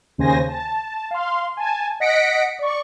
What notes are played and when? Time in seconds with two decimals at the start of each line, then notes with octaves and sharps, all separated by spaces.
0.18 D#2 C#3 C5 G#5 A#6
0.49 A5
1.11 F5 C6
1.57 G#5 A5
2.00 D#5 F#5 A#6 B6 C#7 D7
2.59 D5 C#6